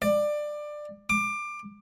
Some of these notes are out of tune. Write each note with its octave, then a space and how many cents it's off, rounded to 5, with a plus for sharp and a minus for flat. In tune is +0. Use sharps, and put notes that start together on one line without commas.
D5 +20
D6 +20